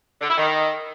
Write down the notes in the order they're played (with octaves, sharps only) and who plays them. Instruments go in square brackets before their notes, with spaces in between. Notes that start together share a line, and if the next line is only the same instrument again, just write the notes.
[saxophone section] D3
E4
D#3